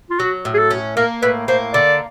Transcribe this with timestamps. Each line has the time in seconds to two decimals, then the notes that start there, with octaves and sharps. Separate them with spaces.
0.10 F4
0.19 F#3 F#4
0.45 A2
0.54 G#4
0.59 A4
0.71 C#4
0.97 A#3 A#4
1.22 A2 B4
1.48 A#3 C5
1.74 D3 D5